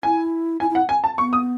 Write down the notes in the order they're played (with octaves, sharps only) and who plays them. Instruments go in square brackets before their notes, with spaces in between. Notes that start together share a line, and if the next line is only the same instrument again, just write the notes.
[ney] E4 [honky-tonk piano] G#5
[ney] E4 [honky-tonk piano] G#5
[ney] E4 [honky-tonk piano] F#5
[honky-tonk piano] G#5
A5
[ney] B3 [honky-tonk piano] C#6
[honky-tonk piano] D#6